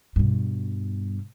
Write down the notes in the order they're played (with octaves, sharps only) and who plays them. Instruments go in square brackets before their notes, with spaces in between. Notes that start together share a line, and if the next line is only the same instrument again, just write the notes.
[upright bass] G2 B2